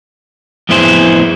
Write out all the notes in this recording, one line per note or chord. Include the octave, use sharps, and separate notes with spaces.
F2 A2 B3 E4 G#4 C5